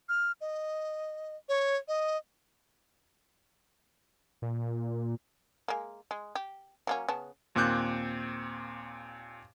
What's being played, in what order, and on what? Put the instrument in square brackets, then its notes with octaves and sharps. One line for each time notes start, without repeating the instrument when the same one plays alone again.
[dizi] F6
D#5
C#5
D#5
[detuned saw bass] A#2
[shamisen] G#3 A#3
G#3
G4
F#3 A#3 C#4
C#3 B3 A5
[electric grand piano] D#2 A#2 C4 D6 F#6 G6